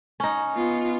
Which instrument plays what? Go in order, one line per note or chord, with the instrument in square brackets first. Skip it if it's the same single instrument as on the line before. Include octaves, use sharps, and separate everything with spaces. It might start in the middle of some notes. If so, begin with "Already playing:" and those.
[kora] C#4 D#4
[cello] B3 F4